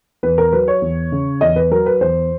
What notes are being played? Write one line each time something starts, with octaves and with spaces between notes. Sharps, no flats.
E2 B4
A#4
F#3 B4
C#5
E2
C#3
E2 D#5
B4
F#3 A#4
B4
E2 C5